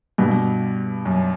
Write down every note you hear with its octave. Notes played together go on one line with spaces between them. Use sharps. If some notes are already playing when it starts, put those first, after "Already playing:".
G2 B2
F#2